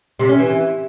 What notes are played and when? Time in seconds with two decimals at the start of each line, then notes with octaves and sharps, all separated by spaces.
0.19 C3
0.29 C#4
0.39 E3